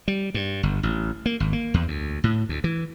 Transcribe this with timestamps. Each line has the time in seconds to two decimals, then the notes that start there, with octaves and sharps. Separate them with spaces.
0.08 G3
0.34 G2
0.63 G1
0.83 A1
1.26 A#3
1.40 G#1
1.53 A#3
1.74 E2
1.88 D2
2.24 A2
2.49 D2
2.64 E3